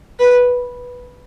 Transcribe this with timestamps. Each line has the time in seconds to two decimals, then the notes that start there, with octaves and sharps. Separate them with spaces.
0.20 B4